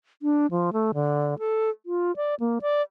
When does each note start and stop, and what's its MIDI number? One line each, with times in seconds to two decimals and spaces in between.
0.22 0.47 62
0.51 0.70 53
0.73 0.92 57
0.94 1.38 50
1.39 1.70 69
1.86 2.15 65
2.16 2.35 74
2.40 2.59 58
2.62 2.82 74